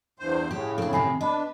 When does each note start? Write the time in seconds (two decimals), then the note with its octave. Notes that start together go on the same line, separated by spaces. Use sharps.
0.19 E2 G2 C5
0.51 A2 C#3 G4
0.78 C4 D4 A4
0.93 C3 D#3 C4 G#5 B5 C7
1.21 D4 B4 D#5 B5